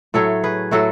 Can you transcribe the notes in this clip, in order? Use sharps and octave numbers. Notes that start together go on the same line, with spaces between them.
A2 F#3 A3 A4 C#5
G#4 B4
A2 F#3 A3 F#4 A4